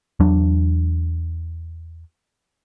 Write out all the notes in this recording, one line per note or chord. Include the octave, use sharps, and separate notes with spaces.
E2 F#3 D4